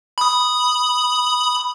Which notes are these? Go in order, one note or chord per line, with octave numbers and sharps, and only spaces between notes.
B5 D#6